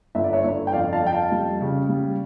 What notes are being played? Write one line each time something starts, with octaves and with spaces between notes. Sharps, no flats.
G1 E5
D5
C#5 E5
G1
G5
F2 D5 F5
F5 A5
F2 G5
F5 A5
G3
C#3
G3